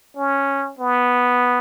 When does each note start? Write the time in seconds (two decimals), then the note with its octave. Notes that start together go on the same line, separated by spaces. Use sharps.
0.17 C#4
0.79 B3